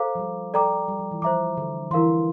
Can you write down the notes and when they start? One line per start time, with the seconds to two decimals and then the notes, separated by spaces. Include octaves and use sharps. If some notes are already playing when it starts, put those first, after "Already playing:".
Already playing: A4 C5 F5 A#5 D6
0.15 F3
0.19 G3
0.54 A4 D5 G5 A#5 D6
0.88 G3
0.99 F3
1.11 E3
1.22 F3 C5 E5 A#5 D6
1.57 D3
1.91 E3 E4 A#4 F5 C6